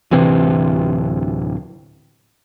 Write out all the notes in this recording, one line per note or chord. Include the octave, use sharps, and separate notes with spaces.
D1 C3 E3 C4